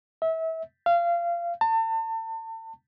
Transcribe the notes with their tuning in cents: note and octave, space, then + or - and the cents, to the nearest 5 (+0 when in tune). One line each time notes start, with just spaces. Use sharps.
E5 -30
F5 -25
A5 +35